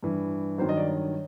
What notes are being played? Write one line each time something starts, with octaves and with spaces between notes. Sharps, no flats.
G2 E3
G2 D#3 F#3 C5
D#5
D5
C#5